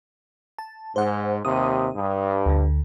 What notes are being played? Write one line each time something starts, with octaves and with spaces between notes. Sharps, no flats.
A5
G#2 C5 F#5
D#2 C3 D#6
G2
D2 D3